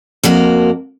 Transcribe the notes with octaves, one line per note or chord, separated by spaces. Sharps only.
F2 A#3 F#4 A#4